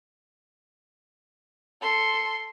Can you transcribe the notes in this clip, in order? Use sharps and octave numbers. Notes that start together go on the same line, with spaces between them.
A4 C6